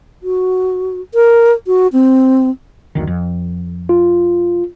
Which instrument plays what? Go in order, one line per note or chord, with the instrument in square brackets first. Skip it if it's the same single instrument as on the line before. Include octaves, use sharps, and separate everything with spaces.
[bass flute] F#4
A#4
F#4
C4
[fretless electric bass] F#1 D2 D#3
F2
[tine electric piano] F4